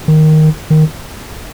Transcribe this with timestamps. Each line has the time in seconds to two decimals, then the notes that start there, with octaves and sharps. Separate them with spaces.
0.08 D#3
0.70 D#3